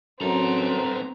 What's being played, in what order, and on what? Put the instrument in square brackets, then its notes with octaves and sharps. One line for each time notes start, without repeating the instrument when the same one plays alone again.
[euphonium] F#2 [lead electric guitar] B3 A4 [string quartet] C4 [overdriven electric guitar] A#5